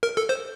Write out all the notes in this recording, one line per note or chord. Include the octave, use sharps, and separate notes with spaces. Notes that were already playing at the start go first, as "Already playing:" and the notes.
A#4
A4
C5